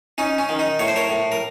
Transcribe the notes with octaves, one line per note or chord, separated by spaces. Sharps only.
C#4 D#4
C#4
D#3
D#4
A2 C#5
C5
A#4 C#5
A2
A#4